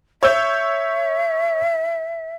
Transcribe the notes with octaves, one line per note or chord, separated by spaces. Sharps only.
C#5 E5 E6 G6